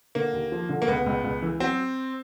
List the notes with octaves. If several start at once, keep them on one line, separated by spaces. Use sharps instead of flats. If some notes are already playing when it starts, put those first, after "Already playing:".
D3 A#3
D#2
F3
D3
A#3
C#2 B3
C#2
C#2
E3
F#3 C4